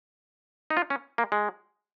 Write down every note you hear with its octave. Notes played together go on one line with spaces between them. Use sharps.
D#4
F4
C#4
A#3
G#3